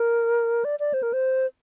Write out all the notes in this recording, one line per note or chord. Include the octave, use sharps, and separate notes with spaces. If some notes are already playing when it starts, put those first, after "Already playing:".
Already playing: A#4
D5
D5
C5
A#4
C5